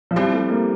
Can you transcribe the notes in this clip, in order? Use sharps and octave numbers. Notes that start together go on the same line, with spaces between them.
F3
G3 C4 E4 G4 C5
A3
A#3